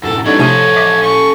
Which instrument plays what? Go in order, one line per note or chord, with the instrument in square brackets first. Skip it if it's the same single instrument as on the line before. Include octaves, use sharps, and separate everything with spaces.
[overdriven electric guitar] F#2 A2 [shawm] A4
[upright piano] E3 D4 D#4 [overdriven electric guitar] G3 A4 [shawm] C#5 [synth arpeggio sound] A6
[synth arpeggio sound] C3 A3 [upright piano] F3 [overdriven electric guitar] C#4 A4 [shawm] C#5
[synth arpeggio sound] D#5 E5 D6
[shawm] C#6